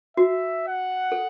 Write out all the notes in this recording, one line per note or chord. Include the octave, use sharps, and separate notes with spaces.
F#4 E5
F#5
A4